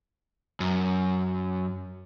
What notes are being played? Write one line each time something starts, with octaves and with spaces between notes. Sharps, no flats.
F#2